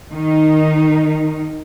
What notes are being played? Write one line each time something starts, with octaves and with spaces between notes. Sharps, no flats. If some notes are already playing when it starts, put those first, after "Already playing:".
D#3 D#4